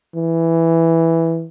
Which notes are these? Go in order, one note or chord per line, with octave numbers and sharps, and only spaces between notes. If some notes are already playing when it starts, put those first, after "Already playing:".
E3